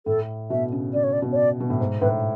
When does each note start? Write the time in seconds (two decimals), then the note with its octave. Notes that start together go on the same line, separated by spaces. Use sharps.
0.06 A2 A4
0.50 B2 E5
0.72 C#3
0.94 C#3 D5
1.04 C#5
1.13 D5
1.22 B2
1.32 C#5
1.36 D5
1.60 B2
1.70 A2
1.80 G#2
2.01 A2 B4